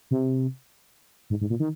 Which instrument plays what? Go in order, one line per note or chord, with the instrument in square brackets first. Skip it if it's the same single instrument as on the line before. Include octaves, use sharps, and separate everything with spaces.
[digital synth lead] C3
G#2
G#2
A#2
D#3